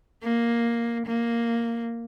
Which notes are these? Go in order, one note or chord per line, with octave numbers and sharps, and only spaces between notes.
A#3
A#3